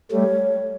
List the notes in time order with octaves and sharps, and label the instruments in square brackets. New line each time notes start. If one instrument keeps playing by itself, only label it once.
[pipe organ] G3 A3 [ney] C#5